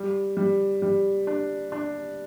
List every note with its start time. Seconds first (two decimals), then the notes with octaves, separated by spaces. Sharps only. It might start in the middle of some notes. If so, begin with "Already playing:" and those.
Already playing: G3
0.37 G3
0.82 G3
1.27 D4
1.72 D4